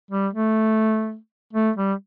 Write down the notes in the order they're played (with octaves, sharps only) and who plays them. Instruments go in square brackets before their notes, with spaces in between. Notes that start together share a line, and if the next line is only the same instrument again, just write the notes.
[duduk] G3
A3
A3
G3